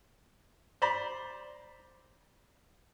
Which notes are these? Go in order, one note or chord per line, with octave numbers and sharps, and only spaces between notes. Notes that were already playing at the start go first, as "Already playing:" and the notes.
C5 D5 A#5 B5